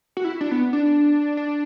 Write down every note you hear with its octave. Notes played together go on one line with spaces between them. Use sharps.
F#4
E4
D4
B3
D4
D4